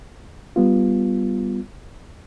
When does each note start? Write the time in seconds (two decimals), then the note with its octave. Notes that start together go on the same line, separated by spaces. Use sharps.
0.56 G3 B3 F4